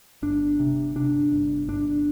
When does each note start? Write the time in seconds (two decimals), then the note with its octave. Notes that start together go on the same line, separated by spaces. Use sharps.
0.22 G1 D4
0.59 C3
0.96 C3 D4
1.32 G1
1.68 G1 D4